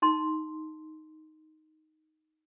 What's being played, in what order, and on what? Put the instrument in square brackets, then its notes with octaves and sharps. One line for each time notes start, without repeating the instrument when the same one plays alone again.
[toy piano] D#4 A5 C6